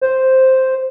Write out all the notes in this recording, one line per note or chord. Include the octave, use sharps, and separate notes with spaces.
C5